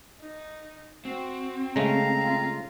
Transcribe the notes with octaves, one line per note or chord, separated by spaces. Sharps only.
D#4
C4 F#4
C#3 G#3 A3 F5 A#5
F4